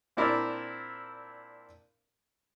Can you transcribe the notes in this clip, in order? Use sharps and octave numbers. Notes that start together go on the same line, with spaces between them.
A#2 C4 D4 E4 A#4 D5